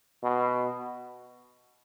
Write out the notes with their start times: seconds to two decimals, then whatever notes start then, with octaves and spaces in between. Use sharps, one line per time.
0.23 B2